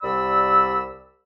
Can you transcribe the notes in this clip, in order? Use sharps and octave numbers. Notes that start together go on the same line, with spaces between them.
C2 D5 B5 E6